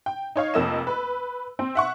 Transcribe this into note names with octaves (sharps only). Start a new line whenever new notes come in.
G5
D#4 C#5 F5
F1 F2 A#3 D#5 E6 E7
B4
C4
E5 F#5 C#6